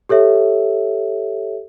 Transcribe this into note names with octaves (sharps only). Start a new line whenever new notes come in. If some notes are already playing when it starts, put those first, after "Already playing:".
G4 A4 C#5 E5